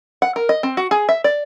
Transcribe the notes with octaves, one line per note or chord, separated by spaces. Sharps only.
F#5
A#4
D#5
C4
F#4
G#4
E5
D5